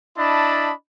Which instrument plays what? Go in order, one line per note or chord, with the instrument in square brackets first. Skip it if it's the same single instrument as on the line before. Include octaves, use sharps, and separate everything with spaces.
[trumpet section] D4 E4 D#5 A5 B5